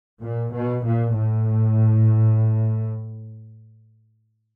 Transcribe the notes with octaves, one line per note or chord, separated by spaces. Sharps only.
A#2
B2
A#2
A2